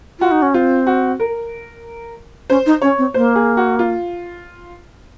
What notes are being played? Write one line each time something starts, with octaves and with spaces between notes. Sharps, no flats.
F4 F#4
D#4
C#4
C4 F4
F#4
A#4
C#4 C5
D#4
C#4 C#5
C4
A#3 C5
G#4
F#4
F4